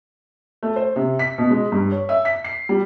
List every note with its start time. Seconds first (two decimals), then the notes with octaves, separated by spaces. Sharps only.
0.63 A3
0.76 C5
0.96 C3
1.19 B6
1.38 B2
1.51 G#3
1.72 G2
1.91 C#5
2.09 E5
2.25 B6
2.44 C7
2.69 G3